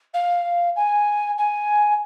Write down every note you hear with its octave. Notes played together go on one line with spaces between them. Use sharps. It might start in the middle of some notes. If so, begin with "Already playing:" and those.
F5
G#5
G#5